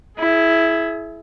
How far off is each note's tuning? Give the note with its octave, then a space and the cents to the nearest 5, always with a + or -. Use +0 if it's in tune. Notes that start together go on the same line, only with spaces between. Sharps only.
E4 +0 G#4 +35